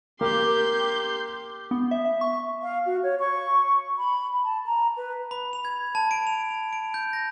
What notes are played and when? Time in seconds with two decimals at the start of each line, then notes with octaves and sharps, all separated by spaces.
0.21 A#3 G4 C6 G6
0.79 G4
1.71 B3
1.91 E5
2.05 E5
2.21 C#6
2.62 F5
2.86 F#4
3.03 C#5
3.19 C#6
3.98 B5
4.44 A5
4.66 A#5
4.97 B4
5.31 B5
5.53 F7
5.65 G#6
5.95 A5
6.11 D7
6.27 F7
6.51 F7
6.73 D7
6.94 G6
7.13 A#6